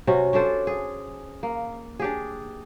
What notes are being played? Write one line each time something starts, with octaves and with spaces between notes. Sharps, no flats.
C3 C#4 F#4
C#4 D4 A4 C5
G#4
A#3
D4 G4 G#4